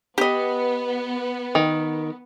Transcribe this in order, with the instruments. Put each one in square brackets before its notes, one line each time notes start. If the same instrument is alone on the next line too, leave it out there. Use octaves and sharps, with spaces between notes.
[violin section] B3 [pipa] G4 D#5
[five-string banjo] D#3